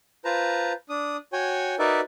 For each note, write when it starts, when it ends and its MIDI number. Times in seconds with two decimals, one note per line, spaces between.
0.25 0.73 65
0.25 0.73 71
0.25 0.73 72
0.25 0.73 81
0.25 0.73 82
0.89 1.17 62
0.89 1.17 87
1.33 1.75 66
1.33 1.75 73
1.33 1.75 79
1.33 1.75 80
1.79 2.00 63
1.79 2.00 66
1.79 2.00 70
1.79 2.00 71
1.79 2.00 74
1.79 2.00 76